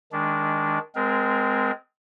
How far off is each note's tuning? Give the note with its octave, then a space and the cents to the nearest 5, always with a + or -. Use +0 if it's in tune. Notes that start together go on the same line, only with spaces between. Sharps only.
D#3 +15 G#3 +0 D4 -10
G#3 +0 C4 -25 A#4 +20